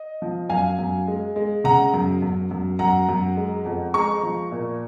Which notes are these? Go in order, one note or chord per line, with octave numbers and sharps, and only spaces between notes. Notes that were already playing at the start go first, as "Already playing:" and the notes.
Already playing: D#5
F3
F#2 F5 G#5
F#2
G#3
G#3
C#3 F#5 A#5
F#2
F#2
F#2
F#2 F#5 A#5
F#2
G#3
F2
G#3 A#5 C#6
F3
A#2